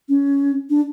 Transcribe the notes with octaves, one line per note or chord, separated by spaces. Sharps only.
C#4
D4